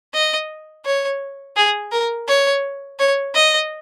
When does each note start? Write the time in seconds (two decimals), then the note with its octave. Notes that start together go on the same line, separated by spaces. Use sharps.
0.14 D#5
0.85 C#5
1.57 G#4
1.92 A#4
2.28 C#5
2.99 C#5
3.35 D#5